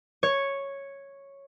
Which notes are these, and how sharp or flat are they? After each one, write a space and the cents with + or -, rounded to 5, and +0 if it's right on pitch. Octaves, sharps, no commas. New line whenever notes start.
C#5 -5